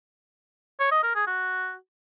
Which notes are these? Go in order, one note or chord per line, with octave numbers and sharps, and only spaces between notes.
C#5
D#5
A#4
G#4
F#4